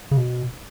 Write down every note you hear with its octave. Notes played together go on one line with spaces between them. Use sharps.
C#3
B2